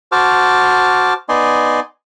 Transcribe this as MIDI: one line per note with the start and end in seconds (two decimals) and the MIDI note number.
0.12 1.13 66
0.12 1.13 72
0.12 1.13 81
0.12 1.13 86
0.12 1.13 89
1.29 1.80 59
1.29 1.80 63
1.29 1.80 74
1.29 1.80 75
1.29 1.80 80
1.29 1.80 84